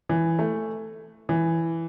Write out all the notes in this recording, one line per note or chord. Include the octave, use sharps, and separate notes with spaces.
E3
A3
E3